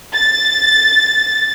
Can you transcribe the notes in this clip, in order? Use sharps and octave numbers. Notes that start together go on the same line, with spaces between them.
A6